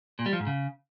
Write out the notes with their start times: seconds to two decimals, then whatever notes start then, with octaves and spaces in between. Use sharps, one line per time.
0.19 A#2
0.26 G3
0.33 F3
0.40 G#2
0.47 C#3